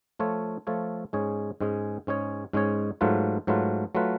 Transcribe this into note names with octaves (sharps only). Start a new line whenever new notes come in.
F3 A3 F4 A4 C#5
F3 A3 F4 A4 C#5
G#2 G#3 C#4 G#4 C#5
G#2 G#3 C#4 G#4 C#5
G#2 G#3 C#4 G#4 C#5
G#2 G#3 C#4 G#4 C#5
G#2 F#3 A3 F4 B4
G#2 F#3 A3 F4 B4
F#3 A3 F4 B4